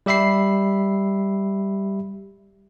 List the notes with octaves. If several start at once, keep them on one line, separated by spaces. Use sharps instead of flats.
G3 G4 E5 B5 C7